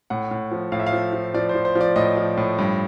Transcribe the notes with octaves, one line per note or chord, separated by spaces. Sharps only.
A2 F#5
A2
F3
A2 F5
E5
F5
F3
F3
F3 D5
C5
F3
C5
F3
D5
A2 D#5
F3
A2
G2